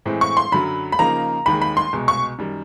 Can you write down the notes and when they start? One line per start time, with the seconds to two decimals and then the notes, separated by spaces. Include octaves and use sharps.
0.06 A2 E3 G#3 C4
0.21 C#6
0.37 C6
0.52 F#2 D3 F#3 B5
0.92 B5
0.99 C#3 F3 A#3 D#4 A#5
1.46 D#2 D#3 G#3 B5
1.62 B5
1.77 C6
1.93 C2 B2 G#3
2.08 C#6
2.39 F#2 D#3 G3